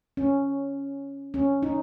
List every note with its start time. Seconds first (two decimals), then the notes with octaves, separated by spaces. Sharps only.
0.17 C#4
1.34 C#4
1.63 D#4